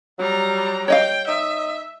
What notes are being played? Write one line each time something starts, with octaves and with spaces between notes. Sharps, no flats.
F#3 G3 A#5
C#5 D#5 F5 G5
D#4 E5